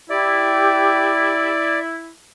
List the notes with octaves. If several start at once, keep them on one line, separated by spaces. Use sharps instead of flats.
E4 G4 D5